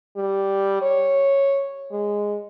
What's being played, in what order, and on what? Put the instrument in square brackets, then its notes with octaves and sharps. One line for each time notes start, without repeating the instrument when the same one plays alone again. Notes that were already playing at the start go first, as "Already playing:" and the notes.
[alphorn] G3
C#5
G#3